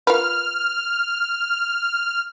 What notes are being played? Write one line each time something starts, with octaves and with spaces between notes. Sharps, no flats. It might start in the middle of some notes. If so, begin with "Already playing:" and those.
F4 A#4 B4 F6